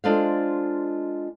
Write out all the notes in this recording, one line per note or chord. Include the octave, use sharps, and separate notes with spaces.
G#3 D4 F4 A4 C5 F5